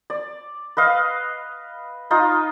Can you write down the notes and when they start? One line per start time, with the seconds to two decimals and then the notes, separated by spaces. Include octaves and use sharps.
0.10 D5
0.77 B4 D#5 F5
2.11 D#4 F4 D#5